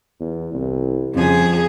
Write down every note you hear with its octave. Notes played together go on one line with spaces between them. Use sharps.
E2
C2
F2 C#3 G#4